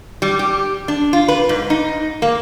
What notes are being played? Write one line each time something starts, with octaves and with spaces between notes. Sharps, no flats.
G3
G4
D4
F4
B4
G#2
D#4
A#3